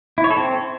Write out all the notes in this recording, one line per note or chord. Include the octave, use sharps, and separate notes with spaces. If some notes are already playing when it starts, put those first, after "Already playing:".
E4
C#5
A4
C4